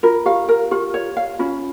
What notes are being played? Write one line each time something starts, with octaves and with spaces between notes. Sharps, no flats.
F4 A#4
G4 F5
A#4
F4 G4
C#5
F5
C#4 F4